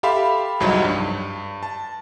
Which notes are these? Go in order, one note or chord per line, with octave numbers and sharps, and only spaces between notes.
G4 A4 E5 F5 B5 C6
C2 F2 G#2 F#3 G3 D#4
G2
A5